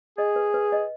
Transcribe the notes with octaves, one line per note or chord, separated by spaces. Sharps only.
G#4 D#5
B4
B4
D#5